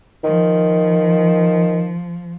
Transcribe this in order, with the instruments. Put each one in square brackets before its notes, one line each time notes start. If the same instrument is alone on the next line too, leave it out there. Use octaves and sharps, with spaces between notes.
[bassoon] D#3 [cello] F3